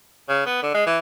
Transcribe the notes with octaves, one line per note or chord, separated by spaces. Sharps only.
C#3
B3
D3
G#3
E3